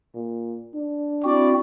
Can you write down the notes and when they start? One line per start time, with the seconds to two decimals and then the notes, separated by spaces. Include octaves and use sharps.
0.15 A#2
0.75 D4
1.24 C4 E4 F#4 D5